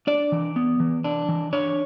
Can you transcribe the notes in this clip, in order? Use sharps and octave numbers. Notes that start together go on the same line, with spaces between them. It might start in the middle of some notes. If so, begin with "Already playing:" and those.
D4 D5
E3
B3
E3
D4
E3
D4 C#5